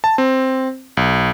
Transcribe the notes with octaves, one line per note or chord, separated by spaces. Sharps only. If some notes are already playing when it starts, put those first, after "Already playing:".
A5
C4
B1